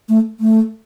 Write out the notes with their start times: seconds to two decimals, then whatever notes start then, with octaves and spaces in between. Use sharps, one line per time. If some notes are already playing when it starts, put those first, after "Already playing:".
0.09 A3
0.40 A3